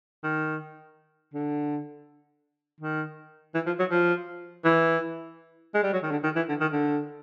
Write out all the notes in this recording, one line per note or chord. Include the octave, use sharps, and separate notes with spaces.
D#3
D3
D#3
E3
F3
F#3
F3
E3
G#3
G3
F#3
D#3
D3
D#3
E3
D3
D#3
D3